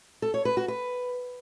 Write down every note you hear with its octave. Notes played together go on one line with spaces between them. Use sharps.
A4
C#5
B4
F#4
B4